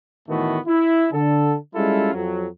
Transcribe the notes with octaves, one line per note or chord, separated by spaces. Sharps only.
A2 D#3 E3 A3 B3 F#4
E4
D3 A4
G3 G#3 C#4 E4 F4 A4
F2 F#3